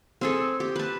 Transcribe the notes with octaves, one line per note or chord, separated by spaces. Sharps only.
C4 G#4 A4
G4
B4 A5